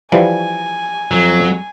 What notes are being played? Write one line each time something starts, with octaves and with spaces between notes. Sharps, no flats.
E3 F3 G3 G#5
F2 F#3